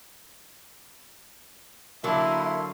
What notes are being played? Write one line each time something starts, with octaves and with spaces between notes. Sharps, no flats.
D3 F#3 A#3 E4 A4 F5 C6